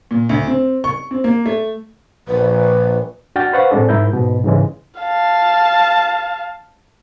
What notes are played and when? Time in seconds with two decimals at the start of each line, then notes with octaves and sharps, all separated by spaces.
0.11 A#2
0.29 D2
0.47 C4
0.84 C#6
1.11 C4
1.24 A#3
1.46 A3
2.28 A#1 B4
3.36 D4 F#4 F#5 G5 F6 A6
3.53 B4 C5 F5 F#5 C#6
3.71 A2 G#3 C4 D4 A4
3.89 G#2 E4 A#4 G6
4.13 G#2 B2
4.45 G#2 C#3 E3 G#3
5.00 F5 A5